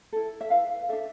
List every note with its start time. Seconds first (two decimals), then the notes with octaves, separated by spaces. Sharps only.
0.12 E4 A4
0.41 E5
0.50 E4 B4 F5
0.89 D4 A4 E5